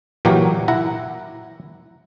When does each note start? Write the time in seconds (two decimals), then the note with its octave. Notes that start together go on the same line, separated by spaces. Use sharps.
0.25 A#2 E3 F#3 F#4 G4 A#4
0.68 E4 F#5 A#5